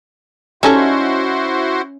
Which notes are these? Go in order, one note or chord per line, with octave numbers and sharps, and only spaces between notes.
G3 C#4 D#4 E4 F#4 A4 C5 E5